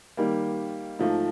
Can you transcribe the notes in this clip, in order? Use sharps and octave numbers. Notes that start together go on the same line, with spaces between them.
D#3 G3 A#3
G#2 F3 A3